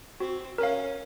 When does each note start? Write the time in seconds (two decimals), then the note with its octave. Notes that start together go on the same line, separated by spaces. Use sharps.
0.20 C4 F#4
0.58 C#4 A#4 F5